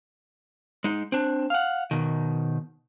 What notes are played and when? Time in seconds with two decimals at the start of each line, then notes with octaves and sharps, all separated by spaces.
0.84 G#3 D#4
1.12 C4 D4
1.50 F5 F#5
1.91 B2 D#3